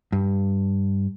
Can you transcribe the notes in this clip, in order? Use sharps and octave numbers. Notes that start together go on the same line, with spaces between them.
G2